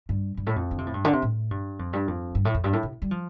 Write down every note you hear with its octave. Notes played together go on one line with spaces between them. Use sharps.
G2
G2
A2
F2
D3
C3
A2
G2
D3
C3
A2
G2
F2
G2
F2
G2
A2
F2
G2
A2
C3
G3
F3